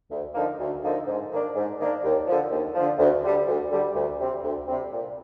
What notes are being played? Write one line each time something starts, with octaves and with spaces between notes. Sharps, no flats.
D2
D3 F3 A#3 D#4
D2
D3 F3 A#3 D#4
G#2
D#3 A#3 D4
G#2
D#3 A#3 D4
D#2
D3 F3
D#2
D3 F3
D2
D3 G3
D2
D3 G3
D2
C3 G3 C4
D2
C3 G3 C4
A#2